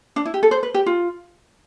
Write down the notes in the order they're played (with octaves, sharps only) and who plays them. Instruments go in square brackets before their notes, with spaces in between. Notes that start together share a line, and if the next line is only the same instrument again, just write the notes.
[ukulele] D4
E4
G4
A4
C5
B4
G4
F4